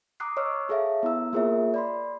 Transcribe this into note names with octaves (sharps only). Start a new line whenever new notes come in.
A#5 D6 D#6 F#6 C7
C#5 D#5 C#6 E6 F6
G#4 A4 C#5 E5 F5
B3 E4 A#5 E6
A#3 F4 G#4 A#4 C#5 E5
D5 B5 C6